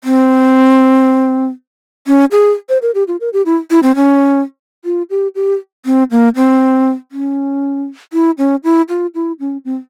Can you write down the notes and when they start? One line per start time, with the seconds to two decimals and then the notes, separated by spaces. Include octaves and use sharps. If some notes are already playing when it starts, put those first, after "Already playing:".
0.04 C4
2.07 C#4
2.32 G#4
2.69 C5
2.82 A#4
2.95 G4
3.08 F4
3.21 A#4
3.33 G4
3.46 E4
3.71 E4
3.83 C4
3.96 C#4
4.85 F4
5.10 G4
5.35 G4
5.86 C4
6.11 A#3
6.36 C4
7.12 C#4
8.13 E4
8.38 C#4
8.64 E4
8.89 F4
9.15 E4
9.40 C#4
9.65 C4